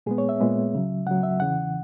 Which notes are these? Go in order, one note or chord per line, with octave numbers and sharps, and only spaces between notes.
A#2 G#3 B3 G#4
C#5
E5
A#2 G#3 B3
C#2 C#3 F#3
C#2 C#3 F#3 F#5
E5
E2 C#3 E3 F#5